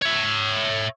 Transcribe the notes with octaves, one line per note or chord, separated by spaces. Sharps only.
C#5 E5